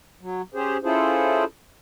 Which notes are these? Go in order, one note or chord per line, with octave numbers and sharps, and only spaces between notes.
F#3
C#4 G4 G#4 C5
C#4 E4 F4 G#4 A4 C5